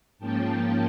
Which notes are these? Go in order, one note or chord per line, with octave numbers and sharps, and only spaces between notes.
G#2 F3 A#3 C#4 G5 A5